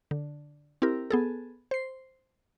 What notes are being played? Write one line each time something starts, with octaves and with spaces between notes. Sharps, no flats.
D3
C4 E4 G4 A#4
B3 G#4 A4
C5 C7